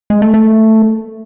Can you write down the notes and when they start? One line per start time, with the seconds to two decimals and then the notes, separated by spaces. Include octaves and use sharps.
0.10 G#3
0.22 A3
0.34 A3